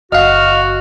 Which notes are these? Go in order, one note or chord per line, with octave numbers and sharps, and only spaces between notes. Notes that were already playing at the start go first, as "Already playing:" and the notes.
F#1 F#4 D#5 F5 F6